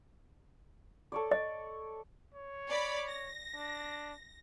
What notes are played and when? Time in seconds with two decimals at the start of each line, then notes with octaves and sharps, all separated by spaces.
1.12 A4 C#5 D5
1.31 D#5
2.34 C#5
2.69 D5 B5
3.09 A#6
3.55 D4